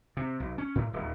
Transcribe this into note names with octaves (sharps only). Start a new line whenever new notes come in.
C3
B1
C#4
A2
D#1